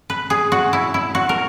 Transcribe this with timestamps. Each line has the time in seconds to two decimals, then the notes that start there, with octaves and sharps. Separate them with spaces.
0.10 B4
0.30 G#4
0.52 F#4
0.73 E4
0.94 E4
1.15 F#4
1.29 A#4